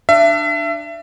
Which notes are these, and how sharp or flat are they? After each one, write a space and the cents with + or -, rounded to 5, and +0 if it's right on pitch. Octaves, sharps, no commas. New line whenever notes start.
D4 +20 E5 +30